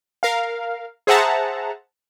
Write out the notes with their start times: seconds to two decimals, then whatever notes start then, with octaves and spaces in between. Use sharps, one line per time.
0.23 A#4 F5
1.07 G#4 C5 E5 F#5 A5 A#5